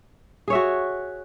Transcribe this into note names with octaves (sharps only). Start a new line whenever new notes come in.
F#4 G#4 C#5 E5